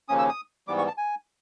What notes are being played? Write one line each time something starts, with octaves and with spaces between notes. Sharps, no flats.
D#2 C#3 F3 A#3 C#4 D#6
E6
D#6
G#2 E3 G3 B3 D6
C#6
A5
G#5